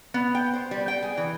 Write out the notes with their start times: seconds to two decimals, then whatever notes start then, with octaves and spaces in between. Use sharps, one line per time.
0.14 B3
0.35 G5
0.53 C5
0.71 G3
0.88 G5
1.02 G#4
1.17 E3